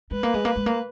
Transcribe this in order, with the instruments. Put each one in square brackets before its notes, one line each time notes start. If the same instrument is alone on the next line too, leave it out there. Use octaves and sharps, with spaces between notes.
[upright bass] G#3 [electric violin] B4
[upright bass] A#3
G#3
A#3
G#3
A#3